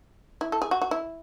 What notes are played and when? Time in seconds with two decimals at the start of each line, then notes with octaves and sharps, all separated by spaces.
0.41 E4
0.52 A4
0.62 G#4
0.71 F#4
0.81 F#4
0.91 E4